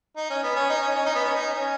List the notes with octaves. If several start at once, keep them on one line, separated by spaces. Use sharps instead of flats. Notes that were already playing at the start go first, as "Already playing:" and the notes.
D#4
C#4
B3
C#4
D#4
C#4
C#4
D#4
B3
C#4
D#4
C#4